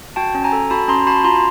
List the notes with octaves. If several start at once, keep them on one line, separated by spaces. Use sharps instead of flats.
F#4 G5 A5
C#4
G#5 A#5
A4
F#4 A5 B5
C#4 A#5 C6
F#4 A5 B5
F4 A#5 C6